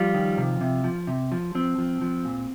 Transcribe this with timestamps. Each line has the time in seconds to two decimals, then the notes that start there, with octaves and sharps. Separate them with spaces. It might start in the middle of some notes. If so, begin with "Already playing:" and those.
Already playing: F3 G3 F4
0.15 D#3
0.38 C3
0.61 C3
0.84 F3
1.07 C3
1.32 F3
1.55 F3 C4
1.78 F3
2.01 F3
2.25 A#2